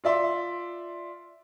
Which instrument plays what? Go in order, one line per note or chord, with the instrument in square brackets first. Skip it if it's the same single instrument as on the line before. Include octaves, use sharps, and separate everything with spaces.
[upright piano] F4 D5 E5 C6